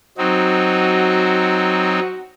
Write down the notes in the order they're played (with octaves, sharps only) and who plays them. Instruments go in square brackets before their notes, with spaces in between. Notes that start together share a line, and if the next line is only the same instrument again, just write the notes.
[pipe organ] F#3 C4 D#4 [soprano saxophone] F#4